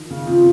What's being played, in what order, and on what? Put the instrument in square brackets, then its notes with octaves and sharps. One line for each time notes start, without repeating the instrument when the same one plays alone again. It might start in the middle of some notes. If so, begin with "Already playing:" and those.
Already playing: [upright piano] D#3 F3
C#3
[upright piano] C3 [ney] F4